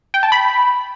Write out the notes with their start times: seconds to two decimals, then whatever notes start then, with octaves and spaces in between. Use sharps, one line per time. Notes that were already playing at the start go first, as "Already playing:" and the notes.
0.14 G5
0.23 A5
0.32 B5